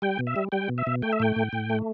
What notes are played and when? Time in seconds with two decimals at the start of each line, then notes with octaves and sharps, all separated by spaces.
0.02 G3 G5
0.19 B2
0.27 E5
0.36 G3
0.52 G3 G5
0.69 B2
0.78 E5
0.87 B2
1.02 A3 G5
1.13 E5
1.20 A2 G5
1.36 A2
1.53 A2
1.70 A3